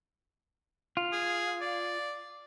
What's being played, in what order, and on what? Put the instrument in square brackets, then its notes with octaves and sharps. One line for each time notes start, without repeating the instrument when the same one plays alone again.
[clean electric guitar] F4
[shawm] G#4
D5